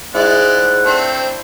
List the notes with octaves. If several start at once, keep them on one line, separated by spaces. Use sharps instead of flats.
G#2 G#3 E4 D5 F#5
A3 C4 D4 C5